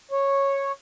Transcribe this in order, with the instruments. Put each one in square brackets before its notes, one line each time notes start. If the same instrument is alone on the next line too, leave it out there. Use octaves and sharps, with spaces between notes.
[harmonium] C#5